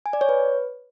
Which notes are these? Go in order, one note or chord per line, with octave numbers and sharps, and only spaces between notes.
G#5
D5
C#5
B4